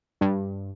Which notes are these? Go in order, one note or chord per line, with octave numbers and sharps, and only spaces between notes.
G2